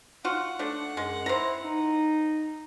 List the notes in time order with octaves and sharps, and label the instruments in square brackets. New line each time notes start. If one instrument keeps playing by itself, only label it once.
[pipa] F4 F#4 [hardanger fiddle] F#5
[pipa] A3 D4
[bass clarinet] F#2 [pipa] G#3
[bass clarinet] E4 [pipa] C5 A#5
[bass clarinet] D#4